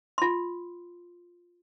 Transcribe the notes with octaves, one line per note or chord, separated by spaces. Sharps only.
F4 C6